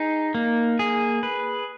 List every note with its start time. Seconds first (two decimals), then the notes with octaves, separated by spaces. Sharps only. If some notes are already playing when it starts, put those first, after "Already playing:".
Already playing: D#4 G#4
0.35 A#3
0.79 G#4
1.23 B4